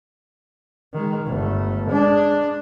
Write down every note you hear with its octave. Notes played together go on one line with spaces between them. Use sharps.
D#3 G#3
G1 A3
G#3 D4